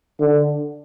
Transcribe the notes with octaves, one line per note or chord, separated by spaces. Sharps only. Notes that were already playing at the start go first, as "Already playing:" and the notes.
D3